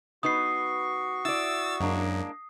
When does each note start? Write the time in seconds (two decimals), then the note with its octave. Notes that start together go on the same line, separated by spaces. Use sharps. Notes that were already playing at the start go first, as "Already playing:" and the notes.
0.23 B3 D#4 F#4 B4 C#6 D#6 C7
1.25 E4 D5 E6 A6
1.80 F#2 G#3 A#3 D4